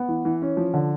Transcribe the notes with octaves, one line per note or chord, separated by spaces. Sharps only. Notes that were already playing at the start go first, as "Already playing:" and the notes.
Already playing: B3
E3
E3
C#4
F3
D3